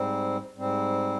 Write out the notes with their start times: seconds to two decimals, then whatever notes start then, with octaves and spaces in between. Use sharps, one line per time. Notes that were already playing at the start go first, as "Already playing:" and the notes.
Already playing: G#2 G3 C4
0.56 G#2 G3 C4